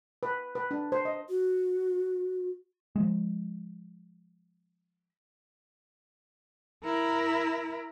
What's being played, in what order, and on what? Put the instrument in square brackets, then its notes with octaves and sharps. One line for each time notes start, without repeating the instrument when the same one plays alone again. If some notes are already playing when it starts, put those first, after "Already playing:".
[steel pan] B4
B4
D4
C5
D#5
[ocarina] F#4
[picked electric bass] F3 G#3
[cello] E4 A#4